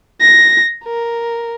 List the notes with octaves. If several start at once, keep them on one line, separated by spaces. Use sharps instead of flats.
A#6
A#4